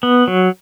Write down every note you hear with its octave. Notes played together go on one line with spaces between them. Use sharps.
B3
F#3